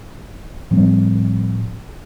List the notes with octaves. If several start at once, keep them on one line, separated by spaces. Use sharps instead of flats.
A2 F3 G3 C4